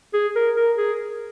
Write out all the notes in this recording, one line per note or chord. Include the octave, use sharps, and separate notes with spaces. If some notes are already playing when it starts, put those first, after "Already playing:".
G#4
A#4
A#4
G#4